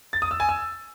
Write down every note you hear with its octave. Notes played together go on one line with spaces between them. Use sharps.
A6
D#6
E6
G#5
E6